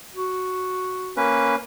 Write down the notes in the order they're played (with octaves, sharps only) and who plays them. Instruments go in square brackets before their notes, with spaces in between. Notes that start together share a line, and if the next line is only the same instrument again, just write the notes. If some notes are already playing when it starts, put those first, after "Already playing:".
[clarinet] F#4
[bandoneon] A#3 C#4 B4